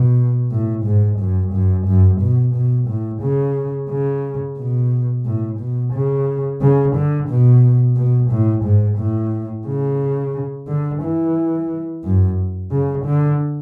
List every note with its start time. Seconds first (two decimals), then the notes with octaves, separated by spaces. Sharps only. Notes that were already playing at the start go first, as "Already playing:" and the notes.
Already playing: B2
0.51 A2
0.85 G#2
1.19 F#2
1.52 F#2
1.86 F#2
2.21 B2
2.55 B2
2.88 A2
3.22 C#3
3.89 C#3
4.58 B2
5.25 A2
5.59 B2
5.93 C#3
6.61 C#3
6.95 D3
7.29 B2
7.96 B2
8.31 A2
8.64 G#2
8.98 A2
9.67 C#3
10.67 D3
11.02 E3
12.04 F#2
12.71 C#3
13.05 D3